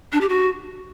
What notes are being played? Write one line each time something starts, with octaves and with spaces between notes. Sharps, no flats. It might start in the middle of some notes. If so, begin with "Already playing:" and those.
D4
G4
F#4